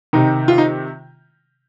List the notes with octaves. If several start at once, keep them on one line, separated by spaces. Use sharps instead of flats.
C3 D#3 D#4
F4
D#4